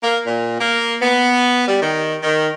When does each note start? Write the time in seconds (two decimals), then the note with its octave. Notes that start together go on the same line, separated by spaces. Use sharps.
0.03 A#3
0.27 A#2
0.61 A#3
1.02 B3
1.68 G3
1.82 D#3
2.23 D#3